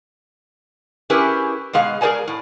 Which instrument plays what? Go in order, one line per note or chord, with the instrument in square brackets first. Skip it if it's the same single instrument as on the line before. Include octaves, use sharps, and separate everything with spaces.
[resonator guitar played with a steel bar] C#4 E4 G4 G#4 A#4 B4
B2 G#3 G#4 F5
G#4 A#4 C5 D5 G#5 A#5
A2